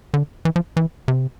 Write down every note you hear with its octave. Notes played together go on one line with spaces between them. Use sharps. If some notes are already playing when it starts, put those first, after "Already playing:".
D3
E3
F3
E3
C3